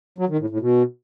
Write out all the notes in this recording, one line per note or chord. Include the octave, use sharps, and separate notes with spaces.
F#3
D#3
A2
A2
B2